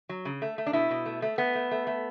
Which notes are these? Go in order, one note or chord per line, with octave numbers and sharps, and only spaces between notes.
F#3
C#3
A3
A3
D4
B2 E4
B2
A3
A3
A3 B3
A3
A3
A3